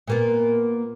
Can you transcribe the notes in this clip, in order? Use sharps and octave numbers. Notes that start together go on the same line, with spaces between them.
A#2 A#3 B3